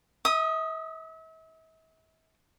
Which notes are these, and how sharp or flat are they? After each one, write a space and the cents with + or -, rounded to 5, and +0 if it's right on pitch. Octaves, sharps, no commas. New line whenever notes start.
E5 -40 D#6 +0